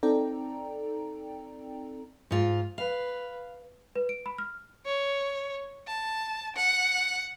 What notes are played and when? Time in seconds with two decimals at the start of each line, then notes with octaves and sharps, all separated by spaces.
0.03 C4 D#4 A4 D5 G5 A#5
2.31 G#2 F4
2.78 B4 F5
3.96 B4
4.09 D7
4.26 B5
4.38 F6
4.86 C#5
5.87 A5
6.56 F#5